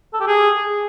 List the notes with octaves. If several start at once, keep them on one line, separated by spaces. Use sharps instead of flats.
A4
G4
G#4